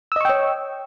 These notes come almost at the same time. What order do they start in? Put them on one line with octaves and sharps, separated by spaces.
E6 D#5 C#6 G5 C#5